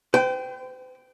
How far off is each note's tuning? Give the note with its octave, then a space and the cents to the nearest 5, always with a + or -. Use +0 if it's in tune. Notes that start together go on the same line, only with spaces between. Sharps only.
C5 -45 G5 -10